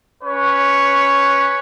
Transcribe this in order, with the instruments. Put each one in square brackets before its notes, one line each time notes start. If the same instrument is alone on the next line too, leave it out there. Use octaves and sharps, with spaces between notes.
[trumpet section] C#4 B4 C#5